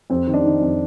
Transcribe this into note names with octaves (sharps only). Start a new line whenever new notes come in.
F2 C4
D#3
D4
D#3 D#4
F2